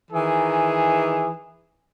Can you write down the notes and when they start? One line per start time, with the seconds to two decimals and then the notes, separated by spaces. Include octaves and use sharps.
0.11 D#3 E3 G#4